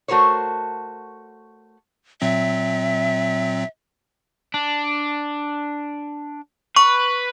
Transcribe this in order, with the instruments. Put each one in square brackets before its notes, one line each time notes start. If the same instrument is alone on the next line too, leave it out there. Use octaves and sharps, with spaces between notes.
[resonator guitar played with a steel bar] A3 F#4 A#4 C5 C#5
[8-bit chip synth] A#2 F#3 C4 [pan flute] E5
[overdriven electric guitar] D4
[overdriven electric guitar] B4 [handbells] C#6